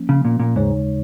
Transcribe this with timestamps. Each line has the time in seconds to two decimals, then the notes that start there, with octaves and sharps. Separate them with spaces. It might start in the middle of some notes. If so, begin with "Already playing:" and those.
Already playing: F3 A#3 C#4
0.09 C#3
0.25 A#2
0.40 A#2
0.55 D#2 G#2 C#3 G#3 D#4 C#5